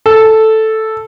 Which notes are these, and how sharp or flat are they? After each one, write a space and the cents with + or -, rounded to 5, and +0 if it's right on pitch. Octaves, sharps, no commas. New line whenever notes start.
A4 +0